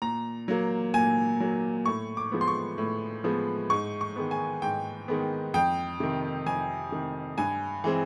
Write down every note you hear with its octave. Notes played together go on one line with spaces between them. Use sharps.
A#2 A#5
F#3 A#3
A#2 G#5
F#3 A#3
A2 C#6
D6
F3 G#3 B3
C6
C#6
A2
F3 G#3 B3
G#2 C#6
C#6
D#3 G#3 B3
G#5
G#2 G5
D#3 G#3 B3
F2 G5
C3 D#3
F2 G#5
C3 D#3
G2 G#5
E3 G#3 C4